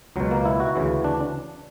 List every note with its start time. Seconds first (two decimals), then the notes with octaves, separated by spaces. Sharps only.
0.16 C#2 B2 F#3
0.31 A#3
0.45 E4
0.60 F#4
0.76 D2 C#3 E3
1.04 D4